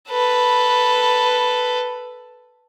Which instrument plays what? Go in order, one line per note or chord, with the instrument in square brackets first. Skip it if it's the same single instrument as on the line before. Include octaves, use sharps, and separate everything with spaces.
[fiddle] A4 B4